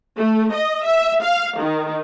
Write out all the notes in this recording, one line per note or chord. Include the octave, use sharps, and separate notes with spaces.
A3
D#5
E5
F5
D#3